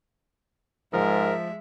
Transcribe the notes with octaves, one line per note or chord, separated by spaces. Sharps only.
G#2 F3 G#3 A#4 E5